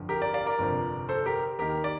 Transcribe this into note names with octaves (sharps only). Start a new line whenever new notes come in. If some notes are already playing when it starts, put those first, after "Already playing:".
Already playing: G1 F2 D3 F3
G4 A#4
A#4 D5
D5 F5
A#4 D5
G1 F2 C3 F3
A4 C5
G4 A#4
D#2 D#3 G4 A#4
D5